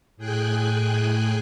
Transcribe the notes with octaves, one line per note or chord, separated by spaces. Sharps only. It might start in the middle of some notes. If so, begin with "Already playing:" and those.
A2 G#4 G5 G#5 F#6